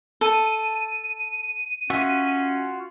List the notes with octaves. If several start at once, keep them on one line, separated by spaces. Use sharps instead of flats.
A4 D#7
C#4 F4 F#4 E5